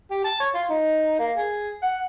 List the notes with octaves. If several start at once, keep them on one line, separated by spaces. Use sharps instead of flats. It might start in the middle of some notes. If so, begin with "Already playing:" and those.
G4
A5
C#5
F4
D#4
A#3
G#4
F#5